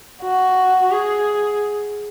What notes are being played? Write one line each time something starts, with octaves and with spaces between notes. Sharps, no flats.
F#4
G#4